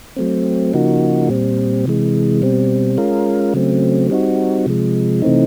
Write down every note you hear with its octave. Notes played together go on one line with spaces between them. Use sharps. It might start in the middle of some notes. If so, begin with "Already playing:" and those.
F#3 A3 C4
C#3 F3 A#3 D#4 F#4
A#2 G3 C4
C3 E3 G#3
B2 G3 C4
G#3 C#4 F4 A#4
C#3 F#3 A3 C4
G3 C4 D#4 F#4
C3 F3 G#3
C3 E3 A3 C4 D#4